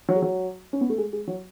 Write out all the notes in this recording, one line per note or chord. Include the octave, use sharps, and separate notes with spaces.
F#3
G#3
F#3
C#4
B3
A3
G#3
G#3
F#3